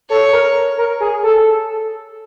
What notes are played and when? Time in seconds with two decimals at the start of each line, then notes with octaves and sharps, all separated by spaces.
0.10 A4 C#5
0.32 A#4
0.78 A#4
1.01 G#4
1.23 A4